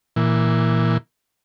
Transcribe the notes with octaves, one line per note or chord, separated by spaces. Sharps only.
A#2 E3